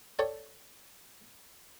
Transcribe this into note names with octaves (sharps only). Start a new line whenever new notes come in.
A4 C#5 D5 G5